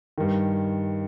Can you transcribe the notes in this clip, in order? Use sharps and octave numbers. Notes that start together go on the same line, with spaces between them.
G2 D#3